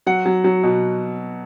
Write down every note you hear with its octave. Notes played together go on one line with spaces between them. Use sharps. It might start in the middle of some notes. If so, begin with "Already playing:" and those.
F#3 F#5
F#3
F#3
B2